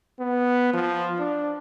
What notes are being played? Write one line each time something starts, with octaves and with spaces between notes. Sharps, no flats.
B3
F3
D4